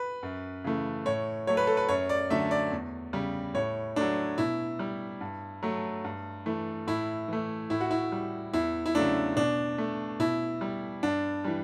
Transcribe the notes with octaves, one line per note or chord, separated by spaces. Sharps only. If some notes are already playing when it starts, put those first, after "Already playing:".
Already playing: B4
F#2
C#3 E3 A3
A2 C#5
F#3 A3 C#5
B4
A4
B4
F#2 C#5
D5
D3 F#3 A3 E5
D5
E2
C#3 G3
A2 C#5
F#3 A3 D4
B2 E4
G3
G2
F#3 A3
G2
E3 A3
A2 E4
E3 A3
A2 E4
F#4
E4
G3
E2 E4
E4
C#3 F#3 A3 D4
B2 D4
A3
B2 E4
G3
G2 D4
E3 G3